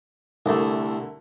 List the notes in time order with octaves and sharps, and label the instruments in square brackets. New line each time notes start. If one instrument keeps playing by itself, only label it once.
[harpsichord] C2 A3 [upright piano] D3 E4 A#4